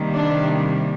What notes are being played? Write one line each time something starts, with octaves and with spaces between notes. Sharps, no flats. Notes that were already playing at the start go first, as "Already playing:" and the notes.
Already playing: C3 D#3 G3 A#3
D4